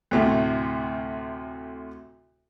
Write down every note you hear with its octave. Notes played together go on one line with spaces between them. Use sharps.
D2 A2 C3